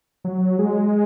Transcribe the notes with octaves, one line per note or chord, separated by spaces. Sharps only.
F#3
G#3